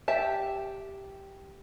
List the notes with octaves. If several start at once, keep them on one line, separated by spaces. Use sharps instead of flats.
G4 E5 A5